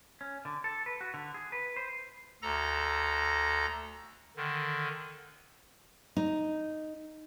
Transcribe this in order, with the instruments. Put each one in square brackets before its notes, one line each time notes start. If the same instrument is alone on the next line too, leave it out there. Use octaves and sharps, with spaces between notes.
[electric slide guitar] C#4
D3
A4
B4
F#4
D3
G#4
B4
C5
[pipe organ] D2 A4 A#5 A#6
D3 D#3
[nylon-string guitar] D#4